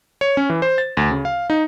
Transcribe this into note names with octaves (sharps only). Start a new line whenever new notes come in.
C#5
C#4
E3
C5
A6
D2
C#3
F5
D#4